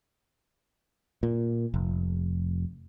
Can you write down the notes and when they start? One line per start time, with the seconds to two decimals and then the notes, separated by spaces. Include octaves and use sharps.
1.23 A#2
1.74 F1